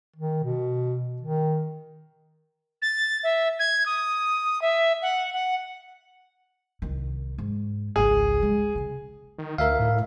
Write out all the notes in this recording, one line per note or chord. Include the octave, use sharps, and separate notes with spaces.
D#3
B2
D#3
A6
E5
G#6
D#6
E5
F#5
F#5
C2 D#3
G#2
G#1 C#2 G#4
G#3
C#3
D#3
D2 A#4 E5 F5
A2